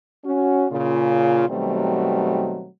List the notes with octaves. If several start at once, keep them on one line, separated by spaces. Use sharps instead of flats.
C#4 F#4
A#2 C#3 F4
B2 D#3 F#3 G3 A3 C4